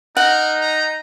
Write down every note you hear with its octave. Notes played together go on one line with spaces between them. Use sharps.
D#4 A#4 F#5
A#5